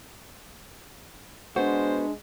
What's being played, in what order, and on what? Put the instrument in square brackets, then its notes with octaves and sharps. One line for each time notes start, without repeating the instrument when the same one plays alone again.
[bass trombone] G#3 [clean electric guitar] B3 F#4 [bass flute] D4 [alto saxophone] C5